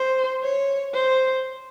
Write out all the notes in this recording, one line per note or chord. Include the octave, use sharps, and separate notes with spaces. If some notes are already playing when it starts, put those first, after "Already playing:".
Already playing: C5
C#5
C5